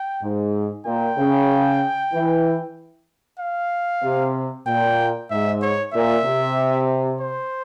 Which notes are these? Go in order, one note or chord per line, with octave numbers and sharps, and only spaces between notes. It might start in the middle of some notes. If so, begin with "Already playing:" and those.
Already playing: G5
G#2
A#2 G5
C#3
E3
F5
C3
A#2 G5
G#2 E5
C#5
A#2 E5
C3
C5